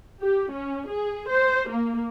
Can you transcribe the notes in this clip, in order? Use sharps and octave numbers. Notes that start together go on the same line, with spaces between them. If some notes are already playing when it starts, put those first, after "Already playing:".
G4
C#4
G#4
C5
A#3